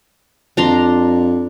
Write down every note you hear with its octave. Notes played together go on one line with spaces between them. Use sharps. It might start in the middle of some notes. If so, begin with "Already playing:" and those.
F2 D4 A#5 C6